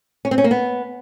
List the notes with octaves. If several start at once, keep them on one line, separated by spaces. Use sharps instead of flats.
C#4
C4
C#4
A#3
B3